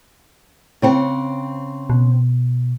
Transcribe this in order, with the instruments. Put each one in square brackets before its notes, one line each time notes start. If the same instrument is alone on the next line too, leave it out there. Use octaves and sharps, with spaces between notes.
[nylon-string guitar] C#3 C4 F#5
[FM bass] B2